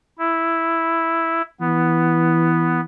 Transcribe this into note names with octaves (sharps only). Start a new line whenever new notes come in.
E4
E3 B3